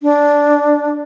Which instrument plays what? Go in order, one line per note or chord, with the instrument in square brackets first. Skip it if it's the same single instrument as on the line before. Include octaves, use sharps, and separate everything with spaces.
[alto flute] D4